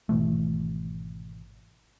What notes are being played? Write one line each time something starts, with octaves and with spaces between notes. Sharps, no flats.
G#1 B2 E3 A3